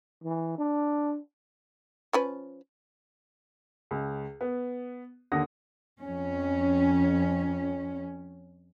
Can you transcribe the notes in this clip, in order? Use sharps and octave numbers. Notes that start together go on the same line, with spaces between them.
E3
D4
F3 C#4 B4
C#2
B3
D#2 D3 F#5 D#6 A#6
F2 C#4